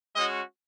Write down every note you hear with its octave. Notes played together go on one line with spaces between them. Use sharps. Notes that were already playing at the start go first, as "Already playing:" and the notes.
G#3 C#4 F#4 D#5